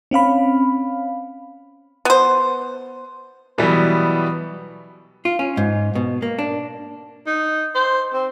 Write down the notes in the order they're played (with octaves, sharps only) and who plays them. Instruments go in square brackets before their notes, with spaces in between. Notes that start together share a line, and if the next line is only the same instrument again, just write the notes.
[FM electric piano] C4 C#4 F5 B5
[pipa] B3 C5
[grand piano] B2 E3 F#3 G3 B3
[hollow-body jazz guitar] F4
C#4
G#2
B2
A#3
D4
[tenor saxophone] D#4
C5
C4